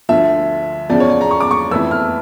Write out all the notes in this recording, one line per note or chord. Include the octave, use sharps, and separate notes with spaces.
D2 D3 F3 E5
E2 C#3 F3 D5
C#5
D5
A#5
C#6
D6
C#6
F2 E3 A3 E4 E6
F6